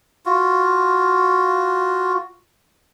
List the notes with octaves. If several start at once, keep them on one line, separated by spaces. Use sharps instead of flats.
F4 F#4